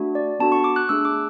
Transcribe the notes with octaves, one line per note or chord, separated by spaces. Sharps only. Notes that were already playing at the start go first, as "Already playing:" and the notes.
Already playing: A3 D4 F#4
D5
B3 D4 F#4 A4 A5
C#6
D6
F#6
A3 D4 G#4 E6
D6